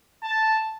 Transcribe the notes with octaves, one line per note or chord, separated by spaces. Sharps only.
A5